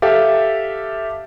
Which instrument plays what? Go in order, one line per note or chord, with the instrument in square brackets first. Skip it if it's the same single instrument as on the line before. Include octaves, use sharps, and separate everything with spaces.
[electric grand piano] G4 A4 E5 F5